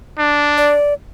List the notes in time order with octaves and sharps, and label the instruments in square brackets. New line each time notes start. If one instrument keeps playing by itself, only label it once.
[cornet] D4
[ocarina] D5